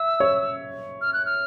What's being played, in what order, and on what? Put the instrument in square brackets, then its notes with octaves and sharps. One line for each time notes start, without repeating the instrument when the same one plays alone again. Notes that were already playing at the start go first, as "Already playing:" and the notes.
Already playing: [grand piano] E5 [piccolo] E6
[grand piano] C#5
[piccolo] F6
F#6
F6